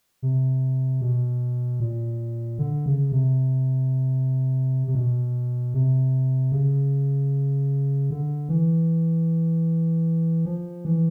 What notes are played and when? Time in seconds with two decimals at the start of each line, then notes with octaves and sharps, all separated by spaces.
0.22 C3
1.01 B2
1.80 A#2
2.59 D3
2.86 C#3
3.12 C3
4.87 C3
4.95 B2
5.74 C3
6.52 C#3
8.11 D3
8.49 E3
10.45 F3
10.85 E3